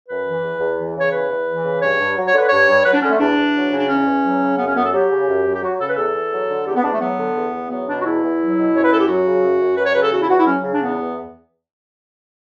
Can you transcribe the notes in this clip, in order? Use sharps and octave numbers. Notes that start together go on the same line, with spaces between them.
F#2 B4
E3
E2
E2
E3
C#3
C#5
E2 B4
E2
E3
C#3
G2 C#5
G2
F#3
C#5
D3 B4
G2 C#5
G2
F#3 B4
D4
D3 C#4
A3
E2 D4
E2
F#3
C#3
D4
E2 C#4
E2
F#3
C#3
F#2 B3
C#4
F#2 B3
A4
F#3 G4
C#3
F#2
F#2
G4
F#3 F#4
C#3 A4
B4
E2 A4
E2
F#3
D3
E2 G4
B3
E2 D4
A3
F#3 B3
D3
E2
E2
F#3 B3
B2 D4
F#4
E2 E4
E2
F#3
B2
F#2 C#5
B4
F#2 A4
G4
F#3 F#4
C#3
F#2
F#2
F#3 B4
C#5
C#3 B4
A4
E2 F#4
E4
E2 F#4
E4
F#3 C#4
C#3
D4
E2 B3
E2